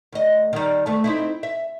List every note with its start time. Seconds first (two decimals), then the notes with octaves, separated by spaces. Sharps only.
0.12 D2 D#5
0.53 D#3 G3
0.86 D2 A3
1.04 C4 D#4 E4
1.43 E5